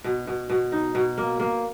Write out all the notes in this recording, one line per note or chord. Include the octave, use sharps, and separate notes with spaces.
B2
B2
B2
D#4
B2
A#3
A#3